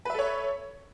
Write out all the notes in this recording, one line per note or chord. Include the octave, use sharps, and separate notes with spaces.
A4 B4 C#5 E5